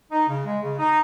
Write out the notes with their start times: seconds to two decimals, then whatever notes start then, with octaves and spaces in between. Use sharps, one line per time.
0.11 D#4
0.28 C#3
0.45 G#3
0.61 C#3
0.78 D#4